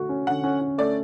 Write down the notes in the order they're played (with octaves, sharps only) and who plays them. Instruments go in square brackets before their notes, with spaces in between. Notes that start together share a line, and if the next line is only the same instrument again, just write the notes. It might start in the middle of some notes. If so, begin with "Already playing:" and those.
Already playing: [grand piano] D3 A3 F#4
C#4
[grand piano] D3 [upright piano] F#5
[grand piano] C#4
C#4
[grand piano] A3 [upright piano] D5